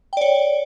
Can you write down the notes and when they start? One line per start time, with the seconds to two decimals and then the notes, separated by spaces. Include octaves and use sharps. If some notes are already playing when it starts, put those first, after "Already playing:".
0.13 G5
0.17 D5
0.21 C#5